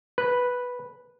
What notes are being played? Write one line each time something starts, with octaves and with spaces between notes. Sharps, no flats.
B4